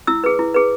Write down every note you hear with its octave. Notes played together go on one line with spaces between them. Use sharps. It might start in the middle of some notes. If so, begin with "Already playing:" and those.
E4 E6
G#4 B4
E4
G#4 B4